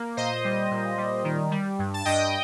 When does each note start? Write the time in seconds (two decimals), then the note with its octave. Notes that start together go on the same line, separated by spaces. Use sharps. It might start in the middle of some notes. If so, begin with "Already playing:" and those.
Already playing: A#3
0.17 A#2 C5 D#5
0.45 G3
0.71 A#2
0.98 G3
1.24 D#3
1.51 G3
1.79 G2
1.94 A5
2.05 G2 D#5 G5